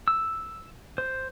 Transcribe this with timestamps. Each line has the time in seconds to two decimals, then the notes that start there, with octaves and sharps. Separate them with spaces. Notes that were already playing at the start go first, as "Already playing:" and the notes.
0.08 E6
0.98 C5